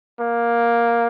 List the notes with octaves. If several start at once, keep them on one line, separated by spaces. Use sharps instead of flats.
A#3